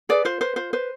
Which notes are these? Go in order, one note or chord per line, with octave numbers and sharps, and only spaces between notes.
G#4 B4 D5
F4 C5
B4 C5
F4 C5
B4 C5